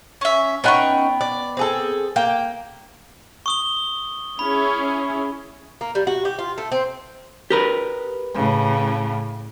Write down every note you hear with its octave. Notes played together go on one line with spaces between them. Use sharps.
C#4 E5
B3 C#4 D#4 F#5 G5 C#6
D5
C4 G#4 A4
A#3 G5
C#6 D#6 G7
C#4 E4 G#4 B5
A#3
G3
F#4
G4
F4
A3
C4
G4 A#4 B4
A2 C#3